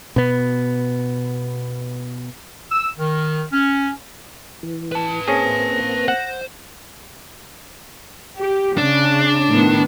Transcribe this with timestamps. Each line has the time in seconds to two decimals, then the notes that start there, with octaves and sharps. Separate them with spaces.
0.16 B2 B3
2.71 E6
2.98 D#3
3.52 C#4
4.63 E3
4.92 B4 A5
5.28 A#3 C4 C#4 G#4 A#6
6.08 C5 F#5
8.38 G4
8.78 C#3 D4
9.51 A2 D#3 B3